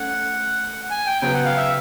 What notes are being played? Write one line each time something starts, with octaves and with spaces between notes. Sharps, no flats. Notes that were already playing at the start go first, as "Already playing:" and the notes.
Already playing: A3 C#4 F#5
G#5
G5
C#3 F#3 B3 G5
F#5
F5
E5